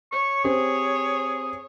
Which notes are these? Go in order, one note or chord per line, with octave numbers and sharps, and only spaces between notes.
C#5 C#6
C4 G4 G#4 C5